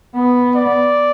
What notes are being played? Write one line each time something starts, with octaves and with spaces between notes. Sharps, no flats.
B3
D5